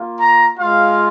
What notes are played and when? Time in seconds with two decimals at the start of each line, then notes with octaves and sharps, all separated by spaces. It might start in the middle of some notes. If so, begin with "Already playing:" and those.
Already playing: A#3 F4
0.18 A#5
0.58 G#3 F4 F5